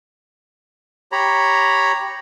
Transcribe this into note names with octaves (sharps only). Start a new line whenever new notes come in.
G4 C#5 A#5 B5